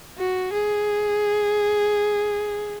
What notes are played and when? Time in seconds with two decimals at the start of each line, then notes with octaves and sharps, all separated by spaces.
0.18 F#4
0.53 G#4